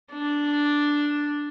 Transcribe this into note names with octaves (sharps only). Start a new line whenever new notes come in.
D4